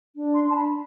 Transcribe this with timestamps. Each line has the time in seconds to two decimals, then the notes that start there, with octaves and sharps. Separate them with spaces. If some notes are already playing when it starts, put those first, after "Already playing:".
0.16 D4
0.35 C6
0.45 D4 A5
0.56 B5